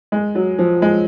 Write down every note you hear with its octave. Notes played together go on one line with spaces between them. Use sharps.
G#3
F#3
F3
G#3